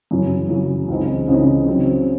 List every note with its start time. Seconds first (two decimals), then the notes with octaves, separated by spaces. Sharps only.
0.11 F#2 C#3 E3
0.49 F#2 C#3 E3
0.88 C#2 C#3 E3 C4 D#4
1.28 C#2 C#3 E3 C4 D#4
1.67 C#3 F#3 C4